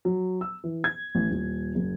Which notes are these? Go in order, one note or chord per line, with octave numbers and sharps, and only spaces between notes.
F#3
E6
E3
G#6
A1
D#1
F#1